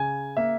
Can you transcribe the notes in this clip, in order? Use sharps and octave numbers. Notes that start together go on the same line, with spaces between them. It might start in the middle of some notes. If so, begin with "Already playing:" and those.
Already playing: C#3 G#5
A#3 E5